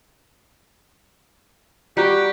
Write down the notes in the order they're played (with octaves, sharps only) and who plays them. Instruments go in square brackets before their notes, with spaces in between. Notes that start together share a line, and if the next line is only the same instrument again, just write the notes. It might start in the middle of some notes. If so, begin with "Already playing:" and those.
[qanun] G3 F#4 [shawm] G4 [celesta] D5 A#5 F#6